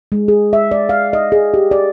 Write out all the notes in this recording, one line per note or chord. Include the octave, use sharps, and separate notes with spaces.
G#3
G#4
E5
D5
F5
D#5
G#4
G4
D5